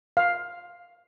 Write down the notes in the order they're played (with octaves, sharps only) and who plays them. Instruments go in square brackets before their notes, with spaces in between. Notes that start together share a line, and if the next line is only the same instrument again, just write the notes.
[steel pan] F5